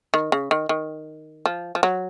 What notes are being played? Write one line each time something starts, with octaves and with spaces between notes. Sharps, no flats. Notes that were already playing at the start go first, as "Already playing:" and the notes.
D#3
C#3
D#3
D#3
F3
F3
F#3